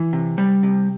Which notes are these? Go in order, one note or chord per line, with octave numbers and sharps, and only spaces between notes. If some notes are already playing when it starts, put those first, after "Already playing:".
Already playing: E3
C3
G3
C3